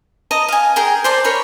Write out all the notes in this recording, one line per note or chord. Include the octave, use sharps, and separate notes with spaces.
D#5 A5 A#5
F5 G#5
G#4 A#4 G5
C5 D5 A5
A#4 C#5 B5 C#6